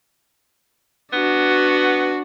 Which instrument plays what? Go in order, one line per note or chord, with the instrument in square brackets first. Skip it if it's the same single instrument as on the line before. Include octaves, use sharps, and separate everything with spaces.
[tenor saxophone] B3 [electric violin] D4 F#4